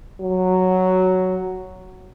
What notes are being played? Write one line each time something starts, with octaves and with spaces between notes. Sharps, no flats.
F#3